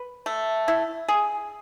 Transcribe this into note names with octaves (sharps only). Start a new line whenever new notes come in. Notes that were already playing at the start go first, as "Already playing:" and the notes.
Already playing: B4
A3
E4
G#4